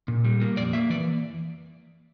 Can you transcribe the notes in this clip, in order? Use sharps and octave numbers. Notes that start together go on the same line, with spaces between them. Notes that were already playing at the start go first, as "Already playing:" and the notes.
A#2
G3
A#3
F2 D5
A#3 E5
E3 D5